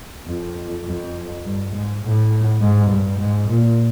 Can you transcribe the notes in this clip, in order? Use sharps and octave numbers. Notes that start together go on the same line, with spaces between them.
F2
F2
G2
G#2
A2
G#2
G2
G#2
A#2